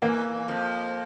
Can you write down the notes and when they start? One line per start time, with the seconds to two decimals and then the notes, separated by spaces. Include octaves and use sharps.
0.02 E2 E3 A#3
0.48 F2 F3